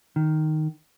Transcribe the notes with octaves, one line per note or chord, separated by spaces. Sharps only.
D#3